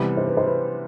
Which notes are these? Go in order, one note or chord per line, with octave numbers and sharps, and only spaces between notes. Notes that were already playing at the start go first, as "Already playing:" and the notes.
Already playing: C3 E3 G3 B3 B4
C5
B4
C5
B4